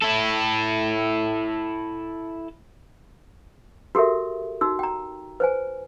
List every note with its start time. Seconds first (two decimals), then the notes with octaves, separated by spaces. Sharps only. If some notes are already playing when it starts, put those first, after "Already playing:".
0.02 E4 A4
3.95 F#4 G4 A4 A#4 E5
4.61 D#4 F#4 E6
4.79 G5 A#5
5.40 B4 C5 G#5